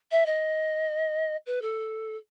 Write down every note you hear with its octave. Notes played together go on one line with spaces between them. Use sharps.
E5
D#5
B4
A4